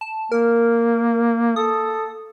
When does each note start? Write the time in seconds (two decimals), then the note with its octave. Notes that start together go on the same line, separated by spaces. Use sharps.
0.01 A5
0.32 A#3 A#4
1.56 A4 D#6